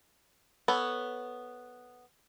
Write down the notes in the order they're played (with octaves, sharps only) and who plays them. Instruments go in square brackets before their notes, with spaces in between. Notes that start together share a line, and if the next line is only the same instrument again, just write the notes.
[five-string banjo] B3 A4 C#5